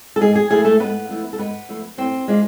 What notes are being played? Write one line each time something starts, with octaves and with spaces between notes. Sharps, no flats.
A4
G#2 G#4
G#4
F3 A3 E4 G#4
A3 A4
G#2 B3 B4
F3 A3 E4
A4
G#2 B3 B4
F3 A3 E4
A2 C4 C5
G#3 D4 F4